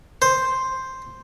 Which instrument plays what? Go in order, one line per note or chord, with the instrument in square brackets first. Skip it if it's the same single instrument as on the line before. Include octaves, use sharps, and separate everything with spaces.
[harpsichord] C5